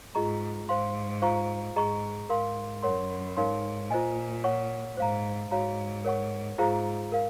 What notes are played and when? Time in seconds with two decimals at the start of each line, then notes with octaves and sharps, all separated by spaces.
0.15 G#2 F4 G#4 D#5 A#5 C#6
0.68 G#2 C5 F5 C6
1.22 F4 C5 F5 A#5 C#6
1.76 G#2 G#4 D#5 A#5 C#6
2.29 G#2 A#4 F5 C6
2.83 F#2 A#4 C#5 F#5 C6
3.36 G#2 D#4 A#4 C#5 F5 C6
3.90 A#2 F4 C5 D#5 G#5
4.44 C#5 F#5 C#6
4.97 G#2 C5 F5 A#5
5.51 G#2 F#4 C#5 F5 A#5
6.05 A#4 C#5 F#5 C#6
6.58 G#2 F4 G#4 C5 F5 A#5
7.12 A#4 F5